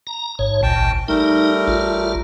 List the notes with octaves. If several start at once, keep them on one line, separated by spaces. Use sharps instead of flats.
A#5
A1 G#2 C#5
G#1 C#2 A#2 G5 A5
G3 A3 D#4 A#4
A1 F4